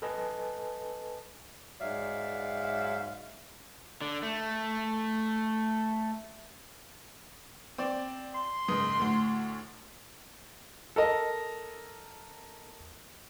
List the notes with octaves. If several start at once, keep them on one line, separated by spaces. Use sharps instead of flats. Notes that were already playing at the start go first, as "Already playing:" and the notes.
A4 B4 D#5 G#5 A5
G#2 F#3 D5 E5 F5
D3
A3
C4 D5
C6
F#1 G#2 D#6
D2 A2
A4 A#4 D#5